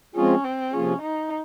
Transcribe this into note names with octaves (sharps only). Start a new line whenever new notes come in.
F3 G#3 C4 C#4 F4 G#4
C4
C3 F3 A#3 C#4 F4 G#4
D#4